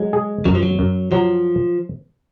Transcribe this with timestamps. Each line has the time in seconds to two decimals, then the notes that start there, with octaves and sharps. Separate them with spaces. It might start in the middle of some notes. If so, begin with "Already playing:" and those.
Already playing: F#3 G#3
0.13 G#4
0.45 F#2 F#3
0.55 F3
0.63 F#3
0.79 F#2
1.12 F3 F#3